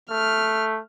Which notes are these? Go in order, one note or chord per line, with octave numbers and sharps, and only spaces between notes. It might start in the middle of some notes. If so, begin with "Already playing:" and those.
A3 F6